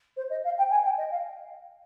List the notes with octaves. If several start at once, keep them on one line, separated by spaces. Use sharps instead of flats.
C5
D#5
F5
G5
G#5
G5
D#5
F5